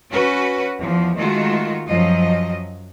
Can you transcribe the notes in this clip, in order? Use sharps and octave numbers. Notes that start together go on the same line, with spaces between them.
C#4 F#4 B4
E2 F3
D#3 G#3 A3 F4 F#4
F#2 F3 F#3 D#5